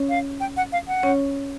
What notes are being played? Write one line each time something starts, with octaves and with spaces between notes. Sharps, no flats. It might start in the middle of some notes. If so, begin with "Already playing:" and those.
Already playing: C#4 C#5
F5
G5
F#5
F5
F#5
C#4 C#5